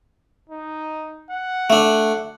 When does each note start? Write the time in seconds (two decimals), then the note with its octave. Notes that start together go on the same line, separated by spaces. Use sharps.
0.49 D#4
1.31 F#5
1.70 A3 D4